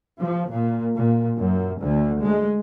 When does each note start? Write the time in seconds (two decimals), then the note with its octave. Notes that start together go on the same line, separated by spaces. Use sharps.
0.20 F3
0.52 A#2
0.96 A#2
1.38 F#2
1.82 D2
2.23 G#3